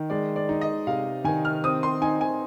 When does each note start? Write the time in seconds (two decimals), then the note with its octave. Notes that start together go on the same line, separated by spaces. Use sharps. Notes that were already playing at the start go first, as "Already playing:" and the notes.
Already playing: D#3
0.10 G#3 D5
0.36 D5
0.49 D#4
0.61 D#5
0.87 C3 F5
1.24 D#3 G#5
1.45 F6
1.64 C4 D#6
1.83 C6
2.02 D#4 G#5
2.21 G#5